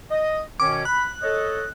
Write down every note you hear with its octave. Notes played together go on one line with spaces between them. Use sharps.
D#5
B2 D#3 C#4 D6
B5 F#6
A4 C#5 D#5